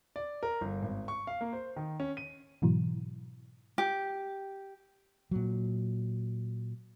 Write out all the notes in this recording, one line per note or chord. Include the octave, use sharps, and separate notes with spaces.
D5
A#4
G1
G#1
C#6
F5
A#3
C5
D#3
C#4
D#7
G#2 B2 E3 F#3
G4
A#2 F#3